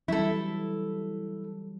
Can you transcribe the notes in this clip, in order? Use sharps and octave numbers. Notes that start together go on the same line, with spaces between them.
E3 F#3 G3 E4 A4